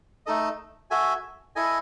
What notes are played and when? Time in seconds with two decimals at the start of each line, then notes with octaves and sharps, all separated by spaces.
0.26 A3 D#4 A4 D#5
0.91 F#4 A4 E5 G#5
1.56 E4 A4 D#5 G#5